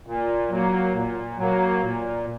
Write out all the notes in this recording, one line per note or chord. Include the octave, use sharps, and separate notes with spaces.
A#2
F#3 A#3
A#2
F#3 A#3
A#2